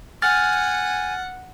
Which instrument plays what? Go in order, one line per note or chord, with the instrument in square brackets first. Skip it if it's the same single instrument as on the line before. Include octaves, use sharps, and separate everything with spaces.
[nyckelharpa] F#5 [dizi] G#5 [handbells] F6 A6